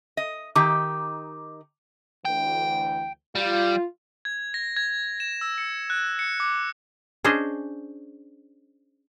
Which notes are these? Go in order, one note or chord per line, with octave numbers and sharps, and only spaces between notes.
D#5
D#3 D#4 G4 D6
D2 E3 G5
G3 F4
G#6
A#6
G#6
E7
E6
C#7
F#6
C#7
D6
C#4 D4 G#4 C5 D#5